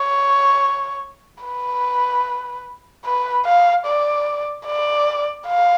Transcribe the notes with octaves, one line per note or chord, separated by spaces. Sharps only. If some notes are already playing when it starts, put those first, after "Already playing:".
Already playing: C#5
B4
B4
F5
D5
D5
F5